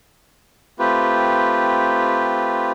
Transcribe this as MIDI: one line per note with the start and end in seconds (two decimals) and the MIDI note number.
0.79 2.72 57
0.79 2.72 60
0.79 2.72 65
0.79 2.72 67
0.79 2.72 71